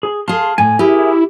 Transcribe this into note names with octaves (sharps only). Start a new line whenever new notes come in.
G#4
G#4 F5 A5 C6
A2 G#5
E4 G4 G#4 A#4 G#5